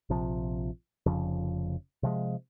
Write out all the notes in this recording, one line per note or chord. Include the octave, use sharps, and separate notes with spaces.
A#1 C3 F3
F1 F2 C#3 F3
C3 F3 G#3